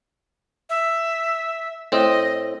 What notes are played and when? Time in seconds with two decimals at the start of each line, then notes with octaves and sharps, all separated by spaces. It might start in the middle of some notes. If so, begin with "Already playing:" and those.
0.70 E5
1.92 A2 C4 D#5